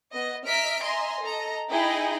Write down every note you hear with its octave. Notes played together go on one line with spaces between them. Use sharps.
B3 D#5
D#5 E5 A#5 F6 B6 D7
D#5 E5 G#5 A#5 C6
A4 D#5 A#5
D#4 E4 G#4 D#5 G5 B5